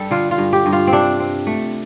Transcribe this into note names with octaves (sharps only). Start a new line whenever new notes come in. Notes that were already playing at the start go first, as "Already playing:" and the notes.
Already playing: G2 G3 D4 A4
D3 F4
F4
G2
G4
G2
F4
C4
C3 D4
C4
A3